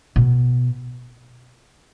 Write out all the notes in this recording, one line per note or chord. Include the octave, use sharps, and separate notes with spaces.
B2